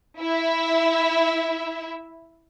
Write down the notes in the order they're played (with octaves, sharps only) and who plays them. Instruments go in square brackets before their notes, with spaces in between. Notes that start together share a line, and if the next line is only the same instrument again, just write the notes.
[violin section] E4 E5